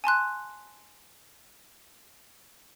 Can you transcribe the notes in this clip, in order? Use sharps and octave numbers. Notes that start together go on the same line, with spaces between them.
G#5 A5 C6 F#6